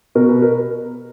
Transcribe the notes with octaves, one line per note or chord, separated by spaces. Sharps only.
B2 A#4
B4
A#4